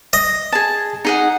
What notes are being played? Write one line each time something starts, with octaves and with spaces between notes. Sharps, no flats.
D#5
G#4 A5
D#4 G#4 F#5